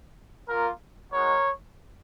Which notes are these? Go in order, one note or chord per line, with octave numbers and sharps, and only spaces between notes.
A#3 F4 A#4
G#3 D#4 F#4 A#4 C#5